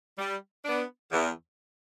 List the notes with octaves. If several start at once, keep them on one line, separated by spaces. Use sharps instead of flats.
G3
B3 D4
E2